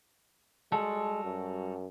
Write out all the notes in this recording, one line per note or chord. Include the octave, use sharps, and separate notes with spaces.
G3 G#3 F#4 A4
F#2